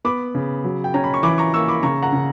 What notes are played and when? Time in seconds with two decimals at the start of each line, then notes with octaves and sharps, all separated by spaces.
0.05 B3 B5 D6
0.35 C#3
0.64 F#3
0.84 G5
0.94 C#4 A#5
1.04 B5
1.14 C#6
1.23 E3 B5 D6
1.38 A#5 C#6
1.54 A#3 C#6 E6
1.68 B5 D6
1.83 C#3 A#5 C#6
2.03 F#5 A#5
2.13 C#3